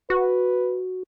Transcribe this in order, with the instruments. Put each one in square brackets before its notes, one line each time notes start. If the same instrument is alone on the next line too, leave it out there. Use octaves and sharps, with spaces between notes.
[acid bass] F#4 [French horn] B4